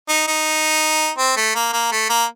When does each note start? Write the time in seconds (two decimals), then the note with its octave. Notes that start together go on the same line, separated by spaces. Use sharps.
0.09 D#4
0.28 D#4
1.18 C4
1.37 A3
1.55 A#3
1.73 A#3
1.92 A3
2.10 A#3